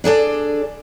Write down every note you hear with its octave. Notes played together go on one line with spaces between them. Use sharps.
D4 G#4 A4 D5